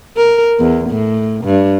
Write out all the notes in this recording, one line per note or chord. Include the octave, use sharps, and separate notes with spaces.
A#4
E2
A2
G2